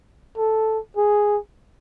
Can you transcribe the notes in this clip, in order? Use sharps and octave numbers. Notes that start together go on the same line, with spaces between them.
A4
G#4